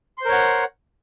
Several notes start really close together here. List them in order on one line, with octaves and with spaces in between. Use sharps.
C6 C5 A#4 C#5 F#5